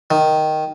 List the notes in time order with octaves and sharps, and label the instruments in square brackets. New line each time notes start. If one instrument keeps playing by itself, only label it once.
[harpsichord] D#3